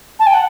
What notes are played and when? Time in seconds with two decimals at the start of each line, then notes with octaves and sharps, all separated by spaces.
0.19 A5
0.26 G5
0.34 F#5